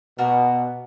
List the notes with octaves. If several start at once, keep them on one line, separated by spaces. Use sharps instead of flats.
B2 F#4 A#4 D5